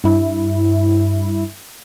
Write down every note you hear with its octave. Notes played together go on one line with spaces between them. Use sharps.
G2 E4